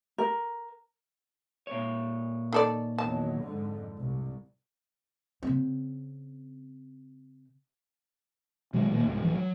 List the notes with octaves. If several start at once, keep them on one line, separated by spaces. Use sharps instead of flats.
A#4
A#2 C#5
D#3 A4 D5
E2 D#3 F#3 A5
F2 G#2 D3
C2
C#3 C4
B2 D#3 F#3 G#3
A#2 D#3 F#3 A#3
C2 G#2
D1 E2 E3 F3
F#3